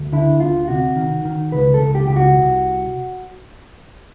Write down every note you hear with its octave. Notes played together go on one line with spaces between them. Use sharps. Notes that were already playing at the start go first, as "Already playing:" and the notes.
Already playing: D2
D3 E4
D2 F4
C3 F#4
D#3
D#3
C#2 B4
A4
C#2
G4
C#2 G4
F#4
C2